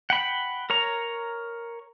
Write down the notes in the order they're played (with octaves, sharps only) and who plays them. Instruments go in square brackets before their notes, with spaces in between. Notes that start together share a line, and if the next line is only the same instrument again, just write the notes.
[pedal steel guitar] F#5 G5 B5
A#4 C#5 A#5